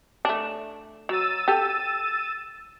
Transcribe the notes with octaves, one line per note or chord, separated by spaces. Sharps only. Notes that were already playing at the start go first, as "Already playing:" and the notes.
A3 D4
F#3 E6 A6 D#7
G4 A4